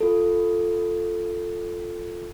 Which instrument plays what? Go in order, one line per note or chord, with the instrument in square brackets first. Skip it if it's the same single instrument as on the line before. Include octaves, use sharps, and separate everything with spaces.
[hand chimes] F4 A4